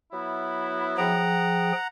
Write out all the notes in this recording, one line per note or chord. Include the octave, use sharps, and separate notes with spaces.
F#3 B3 E4
F3 G#4 F#5 G5 A#5